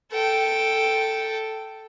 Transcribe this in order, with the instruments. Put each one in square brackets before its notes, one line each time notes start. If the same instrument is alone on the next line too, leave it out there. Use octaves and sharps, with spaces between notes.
[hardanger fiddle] A4 G5